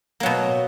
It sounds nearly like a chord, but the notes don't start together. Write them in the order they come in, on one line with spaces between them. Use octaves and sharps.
A#3 F#3 B2